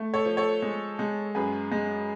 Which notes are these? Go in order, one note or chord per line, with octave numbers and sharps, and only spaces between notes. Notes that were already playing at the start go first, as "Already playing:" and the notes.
Already playing: A3
A4 C#5
F3
A4 C#5
G#3
G#3
F#2 G#4 B4
G#3